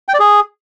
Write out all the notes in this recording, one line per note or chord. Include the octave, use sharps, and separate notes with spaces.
G5
D5
G#4